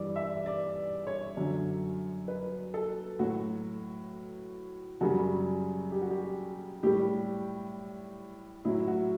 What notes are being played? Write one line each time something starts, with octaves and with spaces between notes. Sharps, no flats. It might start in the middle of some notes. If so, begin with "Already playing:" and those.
Already playing: G2 E3 G3 D5
E5
D5
C#5
F#2 D3 F#3
B4
A4
A2 F#3 F#4
F#2 C#3 G3 F#4
G4
F#4
G4
A2 G3 G4
A2 F#3 E4
F#4